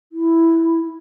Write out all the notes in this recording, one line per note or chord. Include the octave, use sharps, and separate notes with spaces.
E4